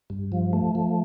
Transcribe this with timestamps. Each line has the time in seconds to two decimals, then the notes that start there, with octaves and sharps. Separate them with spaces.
0.10 G2
0.32 F3
0.53 A3
0.75 F3